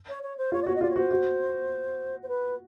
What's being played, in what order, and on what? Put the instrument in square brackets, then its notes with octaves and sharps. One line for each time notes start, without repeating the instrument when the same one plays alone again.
[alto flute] C#5
C#5
C5
[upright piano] F4 [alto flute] C#5
[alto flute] D5
[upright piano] F#4 [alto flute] C#5
[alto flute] D#5
[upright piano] F4 [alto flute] D5
[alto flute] C#5
[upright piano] F#4 [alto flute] C5
[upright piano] F#4
[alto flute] C5
B4